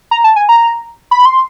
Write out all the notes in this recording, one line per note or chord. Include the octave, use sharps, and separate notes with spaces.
A#5
A5
G#5
A#5
B5
C6